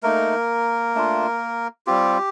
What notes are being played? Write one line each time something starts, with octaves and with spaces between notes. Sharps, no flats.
A3 A#3 D#4 A#4
A3 D4 F4
G3 C4 F4 G4